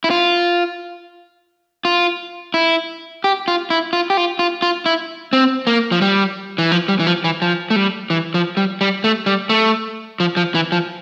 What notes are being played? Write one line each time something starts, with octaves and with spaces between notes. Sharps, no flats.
E4
F4
F4
E4
G4
F4
E4
F4
G4
F4
F4
F4
E4
C4
A#3
F3
G3
E3
F3
G3
E3
F3
E3
F3
A3
G3
E3
F3
G3
G3
A3
G3
A3
F3
F3
E3
F3